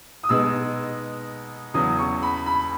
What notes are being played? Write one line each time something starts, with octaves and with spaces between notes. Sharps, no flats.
D#6
B2 G#3 B3 D#4 E6
E2 C#3 F#3 D#6
C#6
B5
B5